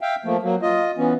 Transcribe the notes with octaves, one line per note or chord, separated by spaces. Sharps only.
E5 F5 G5
F3 A3 A#3
F#3 A#3
F4 D#5
E3 B3 C#4